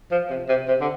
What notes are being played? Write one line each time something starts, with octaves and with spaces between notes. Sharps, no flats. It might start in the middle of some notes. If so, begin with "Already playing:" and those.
F3
C3
C3
C3
D3